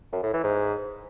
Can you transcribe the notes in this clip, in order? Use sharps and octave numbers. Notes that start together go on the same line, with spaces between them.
F#2
A2
E3
G#2